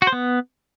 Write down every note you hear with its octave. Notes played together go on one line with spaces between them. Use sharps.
F#4
C5
B3